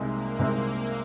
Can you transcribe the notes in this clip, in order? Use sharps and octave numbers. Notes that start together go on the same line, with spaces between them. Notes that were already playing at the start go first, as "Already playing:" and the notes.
Already playing: C2 C3 G#3 A#3 C4 D#4
C2 C3 G#3 C4 D#4